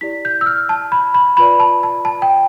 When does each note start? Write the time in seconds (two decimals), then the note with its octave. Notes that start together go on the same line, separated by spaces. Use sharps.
0.01 E4 G4 D5 B6
0.25 G6
0.41 E6
0.46 F6
0.69 A5
0.92 B5
1.14 B5
1.37 F4 B4 D5 B5
1.60 A5
1.83 A5
2.05 A5
2.22 G5